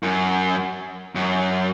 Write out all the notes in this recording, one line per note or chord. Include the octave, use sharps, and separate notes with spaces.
F#2
F#2